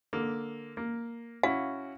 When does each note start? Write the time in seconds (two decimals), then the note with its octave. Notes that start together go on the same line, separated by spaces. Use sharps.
0.13 D3 A#3
0.77 A#3
1.43 C#4 E4 F#4 F5